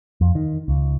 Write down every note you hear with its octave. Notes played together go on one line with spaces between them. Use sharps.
F2
D#3
C#2